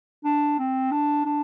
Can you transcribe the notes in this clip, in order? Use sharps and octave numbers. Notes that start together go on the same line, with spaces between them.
D4
C4
D4
D4